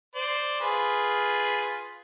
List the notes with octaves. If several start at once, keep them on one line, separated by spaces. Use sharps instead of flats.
C5 D5
F4 G#4 B4